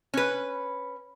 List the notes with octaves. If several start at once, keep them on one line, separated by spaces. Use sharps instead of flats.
C#4 B4